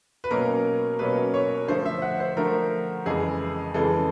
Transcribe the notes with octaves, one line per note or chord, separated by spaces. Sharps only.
B4
B2 F#3 A#3 C#4 A#4
B2 F#3 A#3 C#4 B4
C#5
D3 F3 A3 C5
E5
F#5
C5
D3 F3 A3 A#4
F2 C#3 E3 G#3 G#4
F2 C#3 E3 G#3 A4